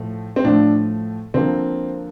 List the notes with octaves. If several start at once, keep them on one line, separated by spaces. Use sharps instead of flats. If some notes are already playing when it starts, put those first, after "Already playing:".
Already playing: A2 F3 A3
C4
A2 F3 A3 D4
D3 F3 A#3 C4